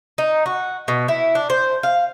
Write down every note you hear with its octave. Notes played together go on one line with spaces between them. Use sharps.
D#4
F#4
B2
E4
D4
C5
F5